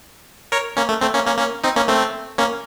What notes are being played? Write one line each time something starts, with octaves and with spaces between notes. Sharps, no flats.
A#4 C#5
A#3 C#4
A3
A3 C4
A#3 C#4
A#3 C#4
A#3 C#4
C4 D#4
A#3 C#4
A3 C4
A#3 C#4